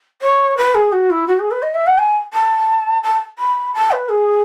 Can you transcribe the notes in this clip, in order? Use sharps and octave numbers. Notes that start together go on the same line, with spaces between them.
C#5
B4
G#4
F#4
E4
F#4
G#4
B4
D#5
E5
F#5
G#5
A5
A5
B5
A5
B4
G#4